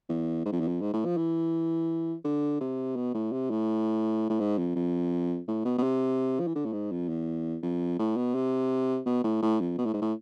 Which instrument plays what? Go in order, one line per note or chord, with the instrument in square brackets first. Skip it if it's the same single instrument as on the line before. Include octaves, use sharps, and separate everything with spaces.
[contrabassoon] E2
G#2
F2
E2
F2
G#2
A2
F3
E3
D3
C3
B2
A2
C3
A2
A2
G#2
F2
F2
A2
B2
B2
C3
F3
E3
D3
A2
G#2
F2
E2
F2
A2
B2
C3
B2
A2
A2
F2
B2
A2
G#2
A2